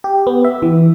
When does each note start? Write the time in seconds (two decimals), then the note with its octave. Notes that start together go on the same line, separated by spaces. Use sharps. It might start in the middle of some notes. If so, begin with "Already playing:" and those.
0.04 G4
0.27 B3
0.44 E5
0.62 E3